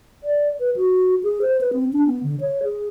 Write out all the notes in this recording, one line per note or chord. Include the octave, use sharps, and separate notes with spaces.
D5
B4
F#4
G#4
C5
B4
C4
D4
B3
D3
C#5
G#4